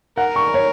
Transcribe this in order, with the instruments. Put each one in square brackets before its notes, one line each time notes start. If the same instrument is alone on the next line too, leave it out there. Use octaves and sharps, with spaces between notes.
[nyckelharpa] A#4 [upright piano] F#5
[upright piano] C#6
C#5